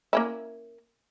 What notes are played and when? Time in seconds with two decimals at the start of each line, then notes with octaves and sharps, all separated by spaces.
0.13 A#3 C#4 E4